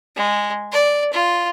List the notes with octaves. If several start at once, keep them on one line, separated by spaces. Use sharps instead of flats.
G#3
D5
F4